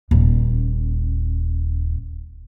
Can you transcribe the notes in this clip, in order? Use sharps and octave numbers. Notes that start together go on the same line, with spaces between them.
D#1 C#4